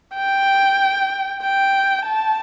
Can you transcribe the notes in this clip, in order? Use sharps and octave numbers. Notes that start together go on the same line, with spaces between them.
G5
G5
A5